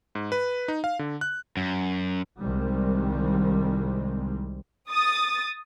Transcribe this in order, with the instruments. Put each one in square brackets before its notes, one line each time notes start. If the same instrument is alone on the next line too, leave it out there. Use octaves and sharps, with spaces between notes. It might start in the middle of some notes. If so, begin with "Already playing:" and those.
[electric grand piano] G#2
B4
D#4
F5
D3
F#6
[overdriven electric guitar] F#2
[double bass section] C2 C3 D#3 G3 G#3 C4
[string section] D#6 A6